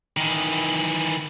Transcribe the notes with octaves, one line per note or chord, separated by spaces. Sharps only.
D#3 E3